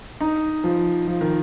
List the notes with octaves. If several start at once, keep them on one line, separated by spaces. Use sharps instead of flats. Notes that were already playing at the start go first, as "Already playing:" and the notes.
D#4
F3
F3
D#3